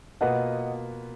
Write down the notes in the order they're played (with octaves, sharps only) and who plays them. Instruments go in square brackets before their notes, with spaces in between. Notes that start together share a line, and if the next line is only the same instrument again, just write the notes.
[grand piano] B2 A#3 F4 B4 [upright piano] D#5 F#5